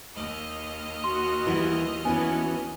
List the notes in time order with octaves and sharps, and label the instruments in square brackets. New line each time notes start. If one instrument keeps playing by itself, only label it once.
[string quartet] D#2 D#5 F6
[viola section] F#4 [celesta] C6
[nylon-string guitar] E3 G3 B3
[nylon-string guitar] E3 C#4 D4 [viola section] B3 F#4 [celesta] G#5